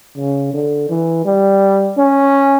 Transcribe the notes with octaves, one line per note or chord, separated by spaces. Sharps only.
C#3
D3
E3
G3
C#4